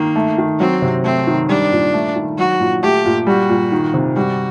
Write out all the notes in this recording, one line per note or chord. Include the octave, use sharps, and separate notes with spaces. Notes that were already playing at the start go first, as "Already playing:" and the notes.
Already playing: D#3 A#3
A3
D#3
F#3 C4
C3
A3 C4
D#3
G3 D4
A#2
A3
D#3
F#3 F#4
A#2
A3 G4
A#2
G3 F#4
A#2
D#3
C3
G3 F#4